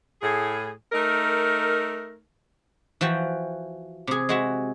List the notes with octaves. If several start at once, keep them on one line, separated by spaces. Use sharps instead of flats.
A2 G#4
A3 D#4 A#4
E3 F3 F#4 G5
C3 G#4
G#3 F#4 E5